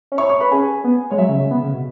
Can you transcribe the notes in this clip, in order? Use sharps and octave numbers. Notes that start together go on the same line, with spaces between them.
C#4
E4 C#5 C#6
C#5 C#6
B4 B5
C#4 G#4 G#5
B3
G#3 C#5
F#3 E5
C#3
C#3
B3
C#3
B2